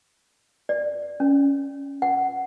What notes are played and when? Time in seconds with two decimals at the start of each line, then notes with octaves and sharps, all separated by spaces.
0.69 D5
1.20 C#4
2.02 F#5